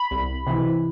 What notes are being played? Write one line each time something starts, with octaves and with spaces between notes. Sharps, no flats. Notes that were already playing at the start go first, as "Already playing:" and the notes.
Already playing: B5
C2
C3 E3